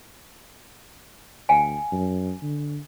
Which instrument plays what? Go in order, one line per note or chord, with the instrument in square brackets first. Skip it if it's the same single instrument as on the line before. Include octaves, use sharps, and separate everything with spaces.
[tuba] D2 [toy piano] F5 G5 G#5
[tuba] F#2
D3